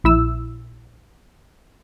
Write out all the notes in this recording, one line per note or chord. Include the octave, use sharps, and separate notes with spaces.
A#1 E4 E6